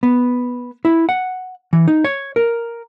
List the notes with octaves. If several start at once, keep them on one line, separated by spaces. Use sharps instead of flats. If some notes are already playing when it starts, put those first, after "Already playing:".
B3
E4
F#5
E3
D#4
C#5
A#4